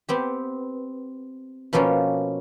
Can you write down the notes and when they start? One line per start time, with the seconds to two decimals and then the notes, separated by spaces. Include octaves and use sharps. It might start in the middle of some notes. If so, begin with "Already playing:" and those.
0.08 B3 C4 G4
1.73 B2 F3 A#3 B3 C#4